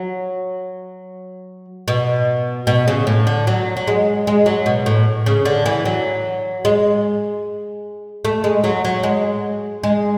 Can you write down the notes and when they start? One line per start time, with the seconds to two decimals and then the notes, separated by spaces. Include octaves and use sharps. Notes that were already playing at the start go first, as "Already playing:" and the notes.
Already playing: F#3
1.88 B2
2.67 B2
2.88 C#3
3.07 A2
3.27 D3
3.47 F#3
3.77 F#3
3.87 G#3
4.27 G#3
4.46 F#3
4.66 B2
4.86 A2
5.26 C#3
5.45 D3
5.66 E3
5.85 F#3
6.65 G#3
8.25 A3
8.44 G#3
8.64 F#3
8.85 F#3
9.03 G#3
9.84 G#3